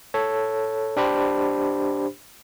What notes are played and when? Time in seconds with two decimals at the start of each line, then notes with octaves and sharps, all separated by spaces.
0.14 A4 C#5
0.97 D4 G4 C5 B5